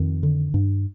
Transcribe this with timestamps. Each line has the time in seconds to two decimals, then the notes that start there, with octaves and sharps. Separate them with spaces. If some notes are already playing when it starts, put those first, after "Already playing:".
Already playing: F2 D#3
0.23 D3
0.54 G2